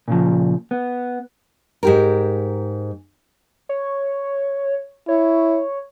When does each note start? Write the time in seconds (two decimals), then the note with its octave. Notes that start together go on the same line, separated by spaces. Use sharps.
0.08 A#2 C#3 F3
0.71 B3
1.83 G#2 G4 A#4
3.69 C#5
5.08 E4 C#5